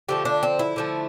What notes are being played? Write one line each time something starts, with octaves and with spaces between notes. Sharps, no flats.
D3 F3 A3 G4
D4
C4
E4
D3 F3 A3